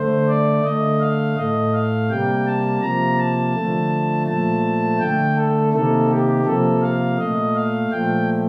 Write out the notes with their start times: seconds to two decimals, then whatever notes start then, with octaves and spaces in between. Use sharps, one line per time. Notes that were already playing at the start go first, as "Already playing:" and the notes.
Already playing: D3 A3 C5
0.28 D5
0.64 D3 A3 D#5
1.00 F5
1.36 A2 A3 D#5
1.73 F5
2.10 C3 G3 A#3 G5
2.47 A5
2.82 C3 F3 A#3 A#5
3.18 A5
3.55 D3 F3 A3
4.27 A#2 F3 A3 A5
5.00 D3 A3 G5
5.37 A4
5.73 C3 D#3 A#3 A4
6.09 G4
6.45 C3 F3 A#3 A4
6.81 F5
7.18 A#2 A3 D#5
7.55 F5
7.91 A#2 F3 A3 G5